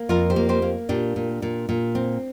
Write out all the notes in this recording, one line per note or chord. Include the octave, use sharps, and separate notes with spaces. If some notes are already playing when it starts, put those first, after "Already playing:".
Already playing: A#3
F2 F4 A#4
G4 C5
A#3
G4 C5
A#3
A#2 D4 G4
A#2
A#2
A#2
C4